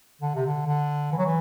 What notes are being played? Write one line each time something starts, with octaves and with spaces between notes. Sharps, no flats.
D3
C3
D3
D3
E3
F#3
E3